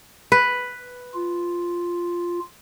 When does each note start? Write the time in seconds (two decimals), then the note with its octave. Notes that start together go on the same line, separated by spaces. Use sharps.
0.32 B4
1.14 F4